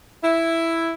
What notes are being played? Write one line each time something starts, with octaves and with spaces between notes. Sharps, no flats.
E4